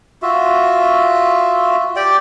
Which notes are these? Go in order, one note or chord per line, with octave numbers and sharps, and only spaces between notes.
F4 F#4 E5
G4 D5 G5